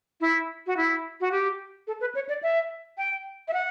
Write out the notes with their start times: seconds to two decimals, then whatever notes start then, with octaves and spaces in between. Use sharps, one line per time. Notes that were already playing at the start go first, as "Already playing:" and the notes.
0.21 E4
0.67 F#4
0.77 E4
1.21 F#4
1.32 G4
1.87 A4
2.01 B4
2.15 C#5
2.29 D5
2.43 E5
2.98 G5
3.48 E5
3.53 F#5